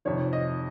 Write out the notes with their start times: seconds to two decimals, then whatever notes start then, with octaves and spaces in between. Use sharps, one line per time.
0.05 F2 C3 D#3 C#5
0.33 D#5